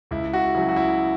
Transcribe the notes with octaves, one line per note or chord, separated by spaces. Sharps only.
C#2 E4
F#4
C#3 F#3 E4
F#4
E4